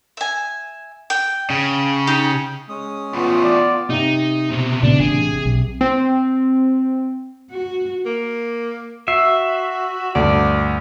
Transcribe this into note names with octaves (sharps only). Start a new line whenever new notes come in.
E5 G#5
G5
C#3
D#4 G4
G#3 C#4 D#6
E2 A2 B3 F4
D5
C3 D#4
B2 C4
A#2 C#3 B3 D4
A1 D4 G#4
B1
C4
F#4
A#3
F#4 E5 C7
D2 G2 D5